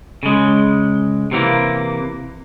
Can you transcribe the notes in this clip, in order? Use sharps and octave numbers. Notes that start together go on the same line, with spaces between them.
C#3 G#3
C3 E3 A#3